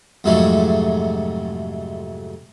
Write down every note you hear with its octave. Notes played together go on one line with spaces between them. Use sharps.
F2 G#2 C3 F#3 G#3 A3